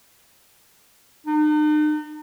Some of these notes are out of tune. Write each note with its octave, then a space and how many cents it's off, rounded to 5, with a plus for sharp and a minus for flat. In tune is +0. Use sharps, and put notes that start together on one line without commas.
D#4 -45